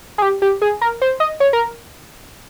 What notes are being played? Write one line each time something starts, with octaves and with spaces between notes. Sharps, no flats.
G#4
G4
G4
G#4
A#4
C5
D#5
C#5
A#4